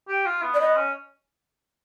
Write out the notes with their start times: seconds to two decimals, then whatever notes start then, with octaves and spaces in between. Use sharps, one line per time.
0.09 G4
0.26 F4
0.43 B3
0.54 D5
0.60 B3 D#5
0.76 C#4